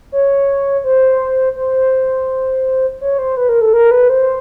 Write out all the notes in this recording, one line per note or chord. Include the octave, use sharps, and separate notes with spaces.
C#5
C5
C5
C#5
C5
B4
A#4
A4
A#4
B4
C5